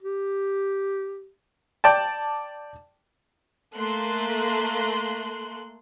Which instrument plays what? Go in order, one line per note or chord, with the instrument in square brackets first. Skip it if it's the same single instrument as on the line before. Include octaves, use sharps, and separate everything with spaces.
[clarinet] G4
[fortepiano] D5 G5 A5
[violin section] A3 A#3 C6 F#6